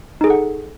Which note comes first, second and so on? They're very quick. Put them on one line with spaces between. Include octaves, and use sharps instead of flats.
D#4 G#4 A4 F#5